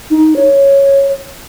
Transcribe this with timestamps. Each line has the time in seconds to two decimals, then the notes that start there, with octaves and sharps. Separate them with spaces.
0.10 D#4
0.36 C#5